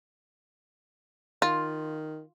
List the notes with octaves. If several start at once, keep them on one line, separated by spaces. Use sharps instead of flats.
D#3 F4